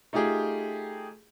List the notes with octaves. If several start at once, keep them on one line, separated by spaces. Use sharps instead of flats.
A3 D#4 F4 G4 G#4